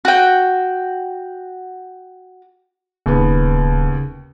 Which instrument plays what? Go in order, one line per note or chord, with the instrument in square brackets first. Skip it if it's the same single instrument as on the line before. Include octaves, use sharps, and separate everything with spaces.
[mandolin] F#4 G5
[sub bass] D1 [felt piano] D#2 B3 [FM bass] C#3